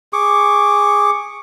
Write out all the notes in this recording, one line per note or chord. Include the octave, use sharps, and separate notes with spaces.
G#4 C#6 D6